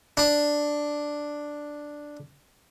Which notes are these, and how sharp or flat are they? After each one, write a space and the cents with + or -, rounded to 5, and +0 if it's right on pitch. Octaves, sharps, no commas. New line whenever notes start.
D4 +5